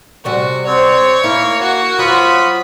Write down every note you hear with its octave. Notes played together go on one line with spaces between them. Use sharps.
C3 G3 C#4 F#4
C4 C#5
A#3 E4 A#4
F#4
F#3 C4 F4 B5 D#6